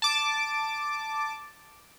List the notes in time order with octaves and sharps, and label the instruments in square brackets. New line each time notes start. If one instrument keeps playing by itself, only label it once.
[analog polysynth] A5 D6